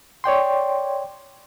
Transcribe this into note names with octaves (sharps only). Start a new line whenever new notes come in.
C#5 D5 G5 C6